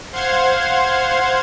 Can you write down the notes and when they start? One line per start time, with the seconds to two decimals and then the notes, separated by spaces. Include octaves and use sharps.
0.13 C5 F5 F#5 C6 G#6